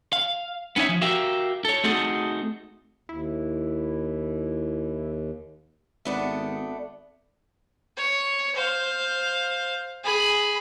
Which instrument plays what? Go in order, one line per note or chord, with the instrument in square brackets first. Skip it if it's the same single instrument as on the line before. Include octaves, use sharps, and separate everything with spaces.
[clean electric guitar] F5
B3 C#4 D#4 C#5 E5
F3
F#4 G4 A#4 E5 F5 G5
A4 C#5
A3 C4 D#4 F#4 G#4 A4
[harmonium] D#2 [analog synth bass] E4
[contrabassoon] G#1 [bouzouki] A3 B3 D4
[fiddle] C#5
C5 F5
G#4 B5